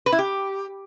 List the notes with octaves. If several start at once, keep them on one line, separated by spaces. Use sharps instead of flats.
B4
E4
G4